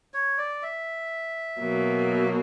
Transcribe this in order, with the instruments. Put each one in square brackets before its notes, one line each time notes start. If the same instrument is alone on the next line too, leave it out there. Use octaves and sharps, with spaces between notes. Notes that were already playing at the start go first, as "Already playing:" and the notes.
[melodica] C#5
D5
E5
[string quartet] B2 F#3 A#3